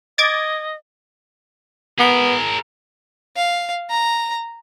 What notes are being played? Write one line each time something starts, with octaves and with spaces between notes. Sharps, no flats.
D#5 D6 G#6 A6
B3 G#4 A#4
F5
A#5